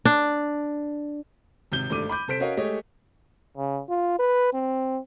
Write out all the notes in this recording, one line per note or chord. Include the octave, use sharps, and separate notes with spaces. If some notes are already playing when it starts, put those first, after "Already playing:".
D4
G#1 C3 G6 G7
G#1 G2 G3 A3 D6 D#7
B5 D6 G6
C3 A4 C5 B6 D7
C#4 F#4 A#4 C#5 D#5 F5
G#3 A3 G4 C#5 D#5
C#3
F4
B4
C4